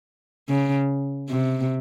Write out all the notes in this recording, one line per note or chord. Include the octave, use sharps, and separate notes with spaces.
C#3
C3